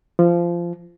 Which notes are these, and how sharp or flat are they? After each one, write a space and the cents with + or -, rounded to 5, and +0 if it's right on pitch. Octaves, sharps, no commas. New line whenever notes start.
F3 -20